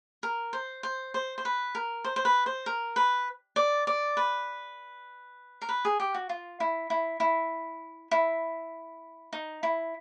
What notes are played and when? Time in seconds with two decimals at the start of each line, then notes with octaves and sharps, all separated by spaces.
0.23 A#4
0.53 C5
0.83 C5
1.14 C5
1.38 C5
1.45 B4
1.75 A#4
2.04 C5
2.16 C5
2.25 B4
2.46 C5
2.66 A#4
2.96 B4
3.56 D5
3.87 D5
4.17 B4
5.62 A#4
5.69 B4
5.85 G#4
6.00 G4
6.14 F#4
6.29 F4
6.60 E4
6.90 E4
7.20 E4
8.11 E4
9.33 D#4
9.63 E4